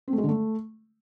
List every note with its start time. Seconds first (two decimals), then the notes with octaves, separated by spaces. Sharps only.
0.08 C4
0.13 A3
0.18 G#3
0.23 D3
0.29 A3